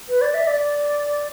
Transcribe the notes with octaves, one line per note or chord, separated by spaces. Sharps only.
B4
D5
E5
D5